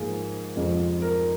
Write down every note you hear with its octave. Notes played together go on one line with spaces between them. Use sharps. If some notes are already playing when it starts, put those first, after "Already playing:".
Already playing: G#2 F3 A#3 G#4
F2 C3 F3 G#3
A#4